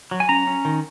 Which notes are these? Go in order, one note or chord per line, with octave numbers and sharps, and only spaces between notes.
F#3
G#5
C#4 A#5
C#4
D#3